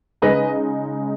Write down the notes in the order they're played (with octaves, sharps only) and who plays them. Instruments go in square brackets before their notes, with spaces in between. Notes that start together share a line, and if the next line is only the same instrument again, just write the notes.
[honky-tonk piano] C#3 G#3 D#4 G#4 [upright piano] B4 D#5